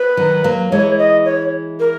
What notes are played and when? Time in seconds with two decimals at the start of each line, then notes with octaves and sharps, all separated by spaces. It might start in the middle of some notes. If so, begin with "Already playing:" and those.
Already playing: B4
0.17 D#3 F#3
0.44 F#3 A#3
0.72 E3 G#3 C#5
0.99 D#5
1.25 C#5
1.80 A#4